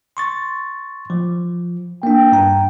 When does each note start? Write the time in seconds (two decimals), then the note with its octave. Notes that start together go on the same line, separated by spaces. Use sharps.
0.17 C6 C#6 A6
1.10 F3
2.03 A#3 D4 G5
2.32 G2 A#5